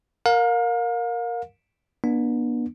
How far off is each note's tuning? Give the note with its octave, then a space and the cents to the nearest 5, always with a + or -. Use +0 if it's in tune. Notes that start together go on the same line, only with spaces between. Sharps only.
A#4 +0 F5 +35
B3 -40 D4 +20